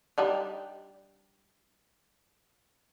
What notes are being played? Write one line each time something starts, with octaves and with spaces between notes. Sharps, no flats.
G3 D4 D#4